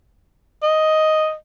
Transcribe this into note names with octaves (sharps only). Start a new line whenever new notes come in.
D#5